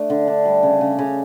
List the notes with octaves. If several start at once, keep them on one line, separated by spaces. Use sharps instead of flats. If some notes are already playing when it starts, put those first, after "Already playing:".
Already playing: A3 D4
D3
D4
G3
C#3
C#3
C#3